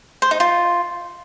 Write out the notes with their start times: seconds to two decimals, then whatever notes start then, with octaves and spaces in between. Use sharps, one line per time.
0.22 C5
0.31 D#4
0.40 F4